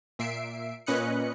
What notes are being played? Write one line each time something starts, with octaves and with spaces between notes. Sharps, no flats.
A#2 E5 C7 D7
A#2 C#4 B4 D#5 F#6 C#7